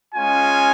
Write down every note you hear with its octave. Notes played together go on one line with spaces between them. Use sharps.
G#3 C#4 F4 G#5